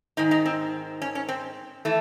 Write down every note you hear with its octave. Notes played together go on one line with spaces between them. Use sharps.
G#2 D#3 D#4
D#4
C4
C#4
C#4
C4
E3 A3